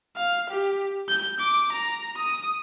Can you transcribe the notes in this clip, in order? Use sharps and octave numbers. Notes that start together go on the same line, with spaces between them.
F5
G4
G6
D6
A#5
D#6